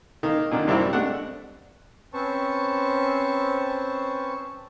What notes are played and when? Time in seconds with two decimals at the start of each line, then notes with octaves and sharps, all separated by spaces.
0.23 D#3 A#3
0.51 A#2 D3 D#3
0.67 F#2 C3 G3 A#3 C4 E4
0.93 G#3 A3 D4 F#5
2.13 C4 C#4 B4 C5 A5 C#6